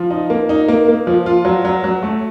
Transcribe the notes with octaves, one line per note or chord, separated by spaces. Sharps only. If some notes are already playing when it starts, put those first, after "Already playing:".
Already playing: F3
D#4
A#3
D#4
A#3
A#3
F3
F4
F#3
F#3
F#3
A3